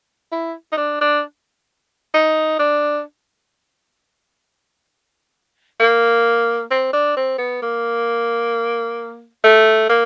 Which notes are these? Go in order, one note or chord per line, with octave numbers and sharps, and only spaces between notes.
E4
D#4
D4
D4
D#4
D4
A#3
C4
D4
C4
B3
A#3
A3
A#3